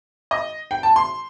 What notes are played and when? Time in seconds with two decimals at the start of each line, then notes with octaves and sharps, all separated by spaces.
0.31 D#5
0.71 G5
0.83 A5
0.96 C6